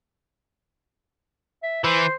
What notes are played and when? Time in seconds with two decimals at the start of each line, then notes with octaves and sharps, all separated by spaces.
1.63 E5
1.84 E3 C5